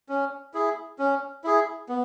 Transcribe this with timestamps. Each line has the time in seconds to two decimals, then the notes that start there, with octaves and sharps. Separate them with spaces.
0.09 C#4
0.54 E4 G#4
0.99 C#4
1.44 E4 G#4
1.89 B3